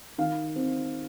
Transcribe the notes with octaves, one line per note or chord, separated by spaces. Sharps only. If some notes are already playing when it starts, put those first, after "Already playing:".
D#3 F5
C4